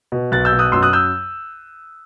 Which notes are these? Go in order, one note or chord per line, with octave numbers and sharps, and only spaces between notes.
B2
B1 F#6 A6
E6 G6
B2
D#6 F#6
F#2 C6 E6
D#6 F#6
E6 G6